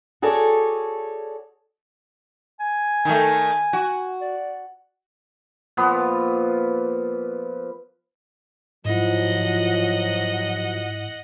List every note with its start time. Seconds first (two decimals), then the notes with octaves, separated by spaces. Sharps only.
0.22 F#4 G#4 A4 C#5 D5
2.60 G#5
3.05 D#3 A3
3.73 F#4
4.21 D5
5.77 A#2 F3 B3 B4
8.85 G#2 F3 F#3 E4 D#5 F#5